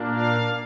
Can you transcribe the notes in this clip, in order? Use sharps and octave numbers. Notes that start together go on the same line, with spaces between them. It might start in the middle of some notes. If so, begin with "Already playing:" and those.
Already playing: A#2 A#3 D4
F5